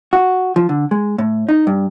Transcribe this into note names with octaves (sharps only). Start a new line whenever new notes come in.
F#4
F3
D3
G#3
A2
D#4
G2